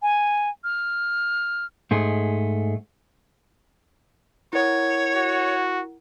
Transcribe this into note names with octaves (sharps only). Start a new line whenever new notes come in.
G#5
F6
G#2 A3 G#4
E4 A#4 C#5 F#5
F#4